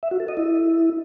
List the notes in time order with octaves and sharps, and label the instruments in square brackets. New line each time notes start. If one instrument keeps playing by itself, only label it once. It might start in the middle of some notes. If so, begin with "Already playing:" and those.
[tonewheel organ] E5
F#4
A4
D#5
E4